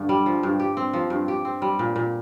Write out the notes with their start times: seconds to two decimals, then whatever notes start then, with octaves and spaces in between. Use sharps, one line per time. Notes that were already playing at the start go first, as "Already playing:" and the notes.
Already playing: G2 D3
0.09 G3
0.26 F3
0.43 G2
0.59 G4
0.77 C4
0.93 F3
1.10 G2
1.28 G4
1.45 C4
1.62 G3
1.79 A#2
1.96 A#2